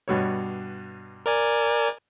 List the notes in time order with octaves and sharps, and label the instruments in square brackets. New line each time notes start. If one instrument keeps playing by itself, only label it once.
[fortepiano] G2 B2 C#5
[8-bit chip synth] A#4 D5 G#5